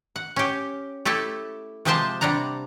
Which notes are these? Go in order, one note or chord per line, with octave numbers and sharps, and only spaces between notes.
F#5
C#4 G4
A3 E4 G4 A4
C3 F3 G#3 G4 C5 A5
C3 G3 D4 F#5 A#5